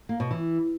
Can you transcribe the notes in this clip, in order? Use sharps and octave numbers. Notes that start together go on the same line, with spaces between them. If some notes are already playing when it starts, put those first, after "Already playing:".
A#3
B2
E3